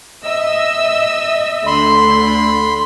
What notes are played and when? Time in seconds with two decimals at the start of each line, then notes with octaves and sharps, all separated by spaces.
0.23 D#5 E5 E6
1.67 D2 D3 B5 C6